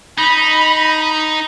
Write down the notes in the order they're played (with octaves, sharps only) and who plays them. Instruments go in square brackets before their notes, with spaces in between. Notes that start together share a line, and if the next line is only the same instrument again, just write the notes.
[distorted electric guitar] D#4 [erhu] B5